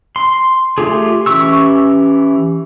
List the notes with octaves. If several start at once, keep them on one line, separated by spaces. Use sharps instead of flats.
C6
A3 F4 G4 G#4
E3 C#4 G4 C#6 E6